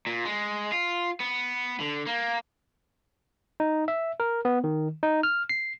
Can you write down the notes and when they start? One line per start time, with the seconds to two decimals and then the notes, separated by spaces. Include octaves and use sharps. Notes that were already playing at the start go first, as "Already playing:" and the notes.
0.07 A#2
0.25 G#3
0.72 F4
1.20 B3
1.80 D3
2.07 A#3
3.60 D#4
3.88 E5
4.20 A#4
4.45 B3
4.64 D#3
5.03 D#4
5.23 F6
5.49 C7